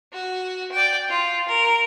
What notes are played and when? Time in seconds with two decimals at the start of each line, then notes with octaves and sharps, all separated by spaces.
0.13 F#4
0.72 D5 G5
1.09 F4
1.48 A#4